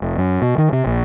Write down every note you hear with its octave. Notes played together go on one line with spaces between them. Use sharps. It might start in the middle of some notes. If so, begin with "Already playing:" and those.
F1
F#2
B2
D#3
C3
A#1